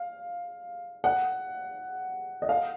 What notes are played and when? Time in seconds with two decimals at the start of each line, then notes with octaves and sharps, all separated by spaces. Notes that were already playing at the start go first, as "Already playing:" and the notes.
Already playing: F5
1.04 F#5
2.42 D#5
2.49 F5